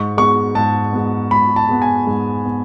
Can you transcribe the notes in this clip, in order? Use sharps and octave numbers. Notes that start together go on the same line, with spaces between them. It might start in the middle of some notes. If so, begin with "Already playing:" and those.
Already playing: G#2 C#6
G#3 B3 C#6
G#2 A5
G#3 B3
G#2 B5
A5
G#3 B3
G#5
G#2
B3